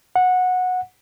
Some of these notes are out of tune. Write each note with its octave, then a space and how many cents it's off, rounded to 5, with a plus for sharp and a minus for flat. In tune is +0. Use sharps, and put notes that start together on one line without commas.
F#5 -15